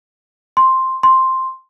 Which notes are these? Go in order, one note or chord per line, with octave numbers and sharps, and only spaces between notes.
C6
C6